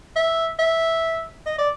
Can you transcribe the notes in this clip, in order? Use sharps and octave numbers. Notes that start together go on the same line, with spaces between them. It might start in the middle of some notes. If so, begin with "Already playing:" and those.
E5
E5
D#5
D5